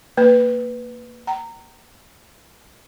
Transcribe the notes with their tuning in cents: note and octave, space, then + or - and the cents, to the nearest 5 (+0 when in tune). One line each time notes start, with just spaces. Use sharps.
A#3 -15 B4 +0
G5 -45 A#5 -15